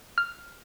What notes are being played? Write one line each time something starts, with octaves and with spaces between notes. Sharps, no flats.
F6